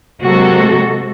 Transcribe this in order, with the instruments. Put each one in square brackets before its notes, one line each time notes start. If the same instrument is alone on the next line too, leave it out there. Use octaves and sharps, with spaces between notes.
[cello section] C3 F#3 G#3 A#3 F#4 A4